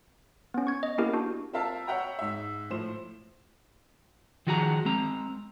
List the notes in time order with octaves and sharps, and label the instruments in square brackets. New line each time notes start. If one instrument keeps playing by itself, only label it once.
[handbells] B3 C#4
C#6 G#6
D#5
A#3 B3 C#4 E4 G4 A#4
D4 F#4
[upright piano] C4 F4 A#4 E5 F5 A5
C#5 E5 F#5 G5 A#5
G#2 E5
A2 F3 C5 E7
[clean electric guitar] D#3 F3 F#4 G#4 F5 A#5
G#3 C4 A#5